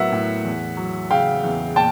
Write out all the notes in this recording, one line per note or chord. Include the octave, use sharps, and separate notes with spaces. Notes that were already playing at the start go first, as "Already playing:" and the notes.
Already playing: A2 F#3 B3 A#4 E5 F#5
A2
E2
F#3
C#3 F5 G5
E2
A#2 G5 A5